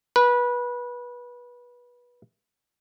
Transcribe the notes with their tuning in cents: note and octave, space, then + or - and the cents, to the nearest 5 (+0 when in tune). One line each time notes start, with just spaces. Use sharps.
B4 -20